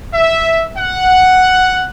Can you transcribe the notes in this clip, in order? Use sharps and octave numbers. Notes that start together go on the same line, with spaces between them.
E5
F#5